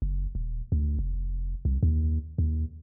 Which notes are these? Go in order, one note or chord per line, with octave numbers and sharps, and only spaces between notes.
F#1
D#1
D2
F1
C2
D#2
D#2